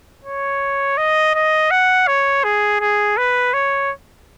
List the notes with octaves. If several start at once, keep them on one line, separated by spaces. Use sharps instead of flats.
C#5
D#5
D#5
F#5
C#5
G#4
G#4
B4
C#5